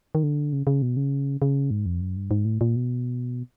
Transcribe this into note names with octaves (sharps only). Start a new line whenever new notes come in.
D#3
D3
C#3
C#3
B2
C#3
C#3
G#2
F2
F#2
G2
G#2
A2
A#2
B2